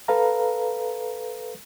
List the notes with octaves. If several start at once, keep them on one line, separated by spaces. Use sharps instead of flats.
A4 B4 F5 A#5